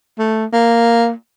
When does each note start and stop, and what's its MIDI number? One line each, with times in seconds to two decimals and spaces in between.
0.19 0.46 57
0.53 1.12 58